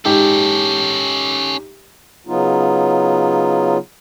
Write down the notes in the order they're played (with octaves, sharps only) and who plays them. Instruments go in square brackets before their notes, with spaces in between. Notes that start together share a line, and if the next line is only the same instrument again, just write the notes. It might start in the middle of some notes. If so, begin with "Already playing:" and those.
[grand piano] G#2 G4 [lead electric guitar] C#4 A4
[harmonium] C#3 F#3 B3 D#4 F4